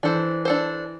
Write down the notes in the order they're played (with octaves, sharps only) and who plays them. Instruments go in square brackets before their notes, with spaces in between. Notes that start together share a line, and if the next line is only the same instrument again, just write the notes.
[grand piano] E3 [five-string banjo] D4 A4 C5
[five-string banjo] D4 A4 C5